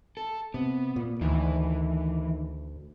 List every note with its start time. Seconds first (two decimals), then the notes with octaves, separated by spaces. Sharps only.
0.17 A4
0.54 C3 B3
0.96 A#2
1.21 D2 D#3 E3